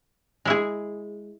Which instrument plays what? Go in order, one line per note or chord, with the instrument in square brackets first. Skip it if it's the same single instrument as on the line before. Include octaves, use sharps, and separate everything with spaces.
[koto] G#3 E4 G#4